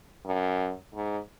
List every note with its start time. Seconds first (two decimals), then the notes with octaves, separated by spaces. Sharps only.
0.25 F#2
0.94 G#2